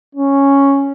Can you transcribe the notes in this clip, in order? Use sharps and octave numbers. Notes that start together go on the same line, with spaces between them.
C#4